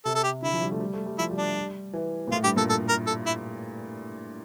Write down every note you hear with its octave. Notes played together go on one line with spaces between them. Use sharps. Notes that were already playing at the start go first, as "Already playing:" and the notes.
C3 A4
A4
G4
D3 E4
F3
G3
A3
G3
A3
G3
F3 E4
G3
D4
E3
A#2
A2 F4
G2 G4
A#2 A4
A4
A#4
A4
E4